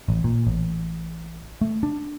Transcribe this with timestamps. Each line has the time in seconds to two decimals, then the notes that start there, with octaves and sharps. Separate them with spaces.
0.08 A1
0.24 A#2
0.47 A1
1.61 A3
1.83 D4